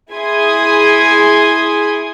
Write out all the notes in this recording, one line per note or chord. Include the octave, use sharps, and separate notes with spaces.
E4 G#4 G#5 C6 D#6 G#6